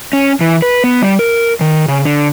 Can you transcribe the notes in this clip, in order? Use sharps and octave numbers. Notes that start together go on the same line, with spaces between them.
C#4
E3
B4
B3
G3
A#4
D#3
C#3
D3